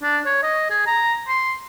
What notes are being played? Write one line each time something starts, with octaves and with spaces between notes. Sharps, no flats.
D4
C#5
D#5
G#4
A#5
C6